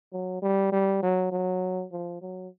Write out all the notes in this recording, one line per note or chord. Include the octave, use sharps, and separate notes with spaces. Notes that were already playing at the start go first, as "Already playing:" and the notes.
F#3
G3
G3
F#3
F#3
F3
F#3